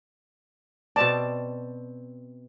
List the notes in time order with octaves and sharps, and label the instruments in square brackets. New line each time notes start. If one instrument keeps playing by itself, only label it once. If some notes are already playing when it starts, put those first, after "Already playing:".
[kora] B2 C4 D5 [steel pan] A5